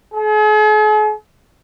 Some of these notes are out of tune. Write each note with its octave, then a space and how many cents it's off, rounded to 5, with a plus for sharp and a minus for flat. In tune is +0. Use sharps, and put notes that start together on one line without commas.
G#4 +45